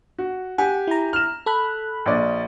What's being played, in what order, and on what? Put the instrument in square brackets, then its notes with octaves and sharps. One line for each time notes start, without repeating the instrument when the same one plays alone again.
[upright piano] F#4
[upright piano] G4 G#5 [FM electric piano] F#5
[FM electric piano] E4 A#5
[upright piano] F6 E7
[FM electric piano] A4 B5 F#6
[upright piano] A#1 D5 D#5